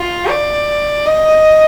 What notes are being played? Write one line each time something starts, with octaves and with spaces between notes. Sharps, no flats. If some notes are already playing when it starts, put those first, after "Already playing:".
Already playing: F4
D5
D#5